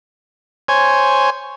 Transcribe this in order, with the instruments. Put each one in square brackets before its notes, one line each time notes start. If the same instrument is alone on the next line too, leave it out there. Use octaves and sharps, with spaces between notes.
[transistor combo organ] C5 C#5 G#5